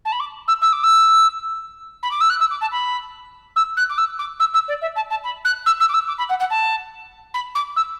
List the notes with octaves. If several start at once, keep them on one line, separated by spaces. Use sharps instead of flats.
A5
B5
D6
E6
E6
D6
E6
B5
D6
E6
F#6
E6
D6
A5
B5
E6
F#6
D6
E6
D6
E6
E6
D5
E5
A5
A5
B5
F#6
E6
E6
D6
E6
D6
B5
F#5
F#5
A5
B5
D6
E6